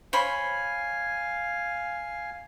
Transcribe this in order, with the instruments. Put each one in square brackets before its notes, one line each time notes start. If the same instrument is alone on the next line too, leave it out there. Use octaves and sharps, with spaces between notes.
[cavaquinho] C5 C#5 B5 [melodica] F5 G#5